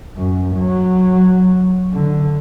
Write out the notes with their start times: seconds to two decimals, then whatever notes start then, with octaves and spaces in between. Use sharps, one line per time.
0.17 F#2
0.57 F#3
1.93 D3